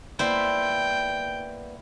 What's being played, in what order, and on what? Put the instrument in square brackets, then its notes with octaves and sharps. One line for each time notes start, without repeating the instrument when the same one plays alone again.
[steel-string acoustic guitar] A#3 B3 D5 [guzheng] E4 C5 [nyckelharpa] G5